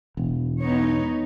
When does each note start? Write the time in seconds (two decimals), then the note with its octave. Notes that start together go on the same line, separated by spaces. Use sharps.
0.17 E1
0.62 B3 D#4 C#5